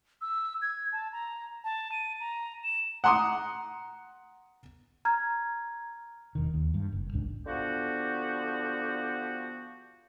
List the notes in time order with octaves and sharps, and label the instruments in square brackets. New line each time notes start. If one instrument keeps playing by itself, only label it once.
[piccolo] E6
G#6
A5
A#5
A5
D#7
A#5
E7
[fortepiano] F#5 A#5 C6 D6 D#6
[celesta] A#5 F6 G#6
[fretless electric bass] E1 D#3
D#2
G2
F#1
D1 G#1 C#2 D4
[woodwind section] D3 F3 B3 F#4 G4